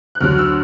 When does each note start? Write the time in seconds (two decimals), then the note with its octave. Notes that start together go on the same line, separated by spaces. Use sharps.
0.15 F#6
0.20 D2 D3 F#3 F6
0.38 E6